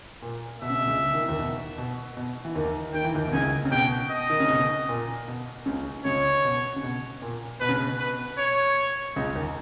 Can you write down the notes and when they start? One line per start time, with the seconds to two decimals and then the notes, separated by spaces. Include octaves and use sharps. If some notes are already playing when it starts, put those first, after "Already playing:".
0.22 A#2
0.62 B2 E5
0.70 C#3
0.79 B2
0.87 C#2 C#3
1.14 D#3
1.21 E3
1.29 D#2 D#3
1.39 B2
1.78 B2
2.17 B2
2.45 E3
2.55 D#2 D#3
2.94 D#3 G5
3.04 E3
3.15 D#2 D#3
3.27 B2
3.33 C#2 C#3 G#5
3.65 C#3
3.72 B2 G5
4.11 D#5
4.30 D#3
4.40 C#3
4.50 B2
4.89 A#2
5.28 B2
5.66 C#2 C#3
6.05 C#2 C#3 C#5
6.45 B2
6.76 C#3
6.83 B2
7.22 A#2
7.60 B2 B4
7.69 C#3
7.77 B2
8.00 B4
8.39 C#5
9.16 C#2 C#3
9.36 D#2 D#3